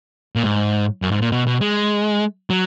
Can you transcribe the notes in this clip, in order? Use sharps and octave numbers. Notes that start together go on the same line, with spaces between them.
A#2
G#2
F#2
G#2
A#2
B2
B2
G#3
F#3